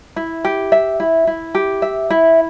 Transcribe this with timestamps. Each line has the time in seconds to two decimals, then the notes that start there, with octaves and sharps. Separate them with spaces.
0.16 E4
0.45 G4
0.72 E5
1.00 E4
1.27 E4
1.55 G4
1.82 E5
2.10 E4